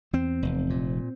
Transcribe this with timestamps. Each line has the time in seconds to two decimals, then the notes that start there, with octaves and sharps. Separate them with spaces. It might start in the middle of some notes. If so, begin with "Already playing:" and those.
0.13 E2 C4
0.42 F1
0.70 A#2